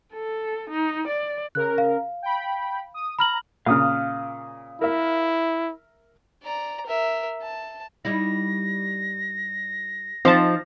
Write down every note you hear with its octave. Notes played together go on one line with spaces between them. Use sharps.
A4
D#4
D5
C#3 A#4 F#6
F5
G5 B5
D#6
A#5 B5 F6 F#7
A#2 C#3 F5 D#6 F6
E4 A#4 E5
D5 A#5
A#4 E5
A5
G3 D#4 E4 A#6
F3 C4 D#4 C5 A5